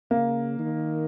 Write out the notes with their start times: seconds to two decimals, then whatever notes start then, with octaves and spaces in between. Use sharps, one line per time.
0.11 C#3 A#3
0.59 D#3